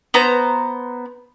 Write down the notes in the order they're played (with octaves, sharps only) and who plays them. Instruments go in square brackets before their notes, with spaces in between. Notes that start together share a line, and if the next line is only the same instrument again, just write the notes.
[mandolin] B3 C5 A#5